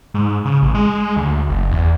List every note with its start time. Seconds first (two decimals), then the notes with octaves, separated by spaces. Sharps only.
0.14 G#2
0.45 C#3
0.62 A1
0.75 G#3
1.16 D2
1.49 F#1
1.71 E2